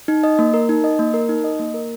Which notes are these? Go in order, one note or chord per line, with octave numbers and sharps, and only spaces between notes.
D#4
D#5
A#3
A#4
D#4
D#5
A#3
A#4
D#4
D#5
A#3
A#4